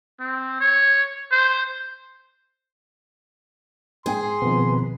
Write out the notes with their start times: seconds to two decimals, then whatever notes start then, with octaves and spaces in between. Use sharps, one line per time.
0.20 C4
0.60 C#5
1.31 C5
4.06 G#2 G#4 G5 G#5 C6
4.42 B2 D#3 F3 B3 C4 B4